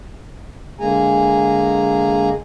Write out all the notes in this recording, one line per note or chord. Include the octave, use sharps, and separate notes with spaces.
D3 G#3 A#3 G#4 G#5 A#5